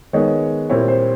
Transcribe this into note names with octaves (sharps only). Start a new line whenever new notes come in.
D#3 G#3 B3 C#5
A#2 G3 C4 E4 C#5
C5